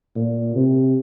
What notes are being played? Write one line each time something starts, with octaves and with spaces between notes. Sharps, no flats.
A#2
C3